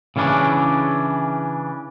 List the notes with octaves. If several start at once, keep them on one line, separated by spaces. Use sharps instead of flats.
C#3 E3 C#4 D4